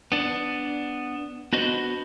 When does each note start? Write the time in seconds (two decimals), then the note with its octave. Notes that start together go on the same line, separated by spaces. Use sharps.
0.12 B3 D4
1.53 B3 D4 F#4 B4 C5 D#5